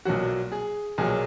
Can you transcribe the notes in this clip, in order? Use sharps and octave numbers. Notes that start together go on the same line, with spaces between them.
B1 A#2 F#3 F#4
G#4
B1 A#2 F#3 G#4